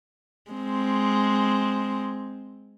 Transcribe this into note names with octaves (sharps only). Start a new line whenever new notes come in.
G#3 C4